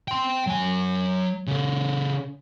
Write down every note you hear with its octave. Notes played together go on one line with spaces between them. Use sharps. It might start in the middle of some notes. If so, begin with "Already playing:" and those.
G5 C6
F#3 G#5
C#3 A4